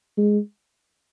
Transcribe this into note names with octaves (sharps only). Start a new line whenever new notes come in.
G#3